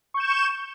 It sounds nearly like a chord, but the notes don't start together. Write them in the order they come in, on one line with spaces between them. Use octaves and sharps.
C#6 G6 E7